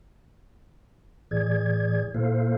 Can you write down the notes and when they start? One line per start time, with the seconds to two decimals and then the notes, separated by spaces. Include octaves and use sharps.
1.31 A2 E3 G#4 D5 G#6
2.14 A#2 A#3 E4 A4 C5 F5